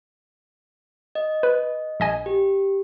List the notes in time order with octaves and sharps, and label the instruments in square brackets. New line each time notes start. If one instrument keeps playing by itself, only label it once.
[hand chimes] D#5
[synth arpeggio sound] B4
A#1 D#5 G#5
[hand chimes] G4